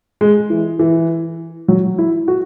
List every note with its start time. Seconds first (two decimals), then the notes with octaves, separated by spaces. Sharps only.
0.21 G#3
0.50 E3
0.79 E3
1.68 F#3
1.98 E4
2.28 F#4